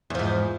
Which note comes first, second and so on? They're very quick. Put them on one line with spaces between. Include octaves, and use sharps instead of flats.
E2 F3 G#2